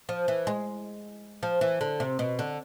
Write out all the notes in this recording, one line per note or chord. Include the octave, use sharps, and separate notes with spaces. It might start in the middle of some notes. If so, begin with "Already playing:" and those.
F3
E3
G#3
F3
E3
D3
C3
B2
D3